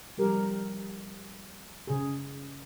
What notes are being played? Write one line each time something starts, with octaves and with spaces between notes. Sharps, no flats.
F3 G3 G4 A#4
C#3 G#4